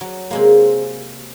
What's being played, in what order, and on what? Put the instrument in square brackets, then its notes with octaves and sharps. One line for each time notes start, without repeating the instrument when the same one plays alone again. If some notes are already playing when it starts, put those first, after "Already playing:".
[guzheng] F#3
C3 G#3 A#3